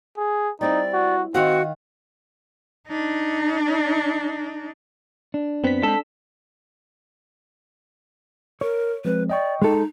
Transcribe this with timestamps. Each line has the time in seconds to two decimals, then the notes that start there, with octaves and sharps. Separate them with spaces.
0.17 G#4
0.61 G3 C4 D#4 E4 D5
0.93 F#4
1.34 D#3 C4 F#4 F5 F#5
2.88 D4 D#4
5.34 D4
5.64 F#2 B3 C4 B6
5.83 G#3 C4 A4 B6
8.61 A#4 C#5
9.05 F3 G#3 C4 B4
9.30 D5 D#5 G5 C#6
9.62 G#3 D#4 A4